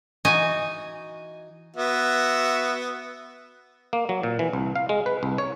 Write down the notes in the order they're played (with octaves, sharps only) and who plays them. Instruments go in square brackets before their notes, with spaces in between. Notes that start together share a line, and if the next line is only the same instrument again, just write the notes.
[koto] E3 D#4 F#4 G#5
[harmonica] B3 F#4 E5
[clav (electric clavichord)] A#3
F#3
A#2
E3
C2
F5
G#3
B4
C2
C#5